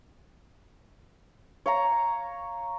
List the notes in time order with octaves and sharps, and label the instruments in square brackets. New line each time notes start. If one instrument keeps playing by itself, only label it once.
[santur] C#5 F5 A#5